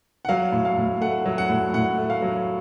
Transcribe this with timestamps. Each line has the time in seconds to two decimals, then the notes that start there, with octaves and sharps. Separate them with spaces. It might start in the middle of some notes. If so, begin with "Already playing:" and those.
0.25 F#5
0.29 F#3 F5
0.52 A2
0.65 F5
0.78 A2
1.01 A3 F#5
1.26 F#3
1.38 F#5
1.50 A2
1.73 A2 F#5
1.98 A3
2.10 F5
2.22 F#3